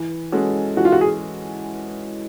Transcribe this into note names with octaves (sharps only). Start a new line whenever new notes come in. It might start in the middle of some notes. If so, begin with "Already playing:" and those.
Already playing: E3
G#3 C#4 F#4 A4
E3 F#4
F4
F#4
G#4